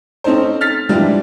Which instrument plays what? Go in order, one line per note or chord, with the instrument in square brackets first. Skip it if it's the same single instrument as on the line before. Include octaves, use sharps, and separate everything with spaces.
[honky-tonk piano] C4 C#4 D#4 A4 C5
F6 A6 B6
E3 F3 G3 G#3 D4